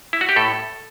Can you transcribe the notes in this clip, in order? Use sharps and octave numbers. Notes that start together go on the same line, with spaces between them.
E4
F#4
G4
A2 A4